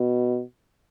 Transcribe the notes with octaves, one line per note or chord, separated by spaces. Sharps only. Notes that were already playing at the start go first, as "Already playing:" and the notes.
Already playing: B2